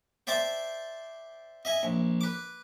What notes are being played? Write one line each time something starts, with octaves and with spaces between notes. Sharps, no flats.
C5 D5 E5 G5 A5 D6
D#5 E5 G#5
A#1
B4 D6